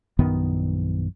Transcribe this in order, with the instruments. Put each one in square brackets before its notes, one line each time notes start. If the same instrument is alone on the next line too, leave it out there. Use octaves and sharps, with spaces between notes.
[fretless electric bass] A#1 F#2 D#3 B3